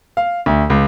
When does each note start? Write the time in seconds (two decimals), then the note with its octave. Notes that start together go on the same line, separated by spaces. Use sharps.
0.17 F5
0.46 D2
0.70 C#2